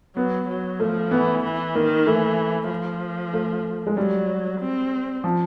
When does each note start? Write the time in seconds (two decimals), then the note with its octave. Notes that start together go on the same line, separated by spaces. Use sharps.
0.16 F#3 B3
0.48 F#3
0.80 F3 A3
1.11 E3 B3
1.44 E3
1.75 D#3 A#3
2.06 E3 A3
2.70 F3
3.33 A3
3.87 G#3
3.97 F#3 G3
4.60 C4
5.24 F3